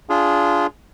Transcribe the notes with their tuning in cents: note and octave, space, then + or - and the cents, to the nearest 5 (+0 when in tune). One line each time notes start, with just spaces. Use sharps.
D4 -20 F4 -10 G#4 +0